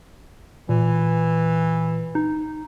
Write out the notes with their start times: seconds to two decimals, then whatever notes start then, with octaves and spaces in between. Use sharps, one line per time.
0.69 A#2 E3
2.15 D#4